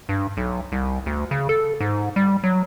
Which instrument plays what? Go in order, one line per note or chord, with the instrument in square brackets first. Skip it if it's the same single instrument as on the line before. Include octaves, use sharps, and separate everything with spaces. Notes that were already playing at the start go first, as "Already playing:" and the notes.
[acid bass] G2
B1
C2
D2
C#3
A4
G#2
G3
F#3